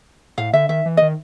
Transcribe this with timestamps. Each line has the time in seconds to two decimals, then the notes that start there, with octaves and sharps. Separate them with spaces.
0.38 A2 F5
0.53 D3 E5
0.69 D#3 E5
0.86 E3
0.97 D#5
1.02 D#3